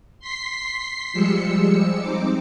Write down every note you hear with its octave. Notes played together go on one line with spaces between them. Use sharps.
C6 B6 C7
F3 G3 G#3 E6 C#7
C4 D#4 D6